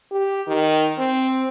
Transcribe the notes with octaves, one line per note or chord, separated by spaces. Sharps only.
G4
D#3
C4